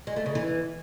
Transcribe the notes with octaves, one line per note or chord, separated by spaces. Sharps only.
G#3
A3
C#3
E3